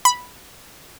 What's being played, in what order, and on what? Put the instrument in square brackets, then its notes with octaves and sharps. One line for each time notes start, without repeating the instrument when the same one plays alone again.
[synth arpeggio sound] B5